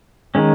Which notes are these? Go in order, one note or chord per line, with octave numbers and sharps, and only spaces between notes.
D#3 G#3 C#4